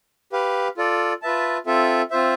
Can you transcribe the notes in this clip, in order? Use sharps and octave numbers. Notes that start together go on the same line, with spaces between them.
G4 B4 F5
F4 A4 D5
F4 B4 E5 A5
C4 F4 A4 E5
C4 F4 C5 E5